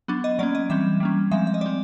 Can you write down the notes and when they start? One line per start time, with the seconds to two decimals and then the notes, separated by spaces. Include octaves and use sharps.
0.08 F#3 B3 D4
0.24 D#5
0.39 F#3 A#3 C#4 D5
0.55 D#5
0.70 E3 G3 C4 E5
1.00 G3 A#3 C#4
1.31 F3 G#3 C4 E5
1.47 E5
1.54 D#5
1.61 G3 C4 D5